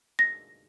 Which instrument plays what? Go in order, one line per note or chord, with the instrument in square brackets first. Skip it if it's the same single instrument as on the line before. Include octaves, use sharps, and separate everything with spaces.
[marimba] A#6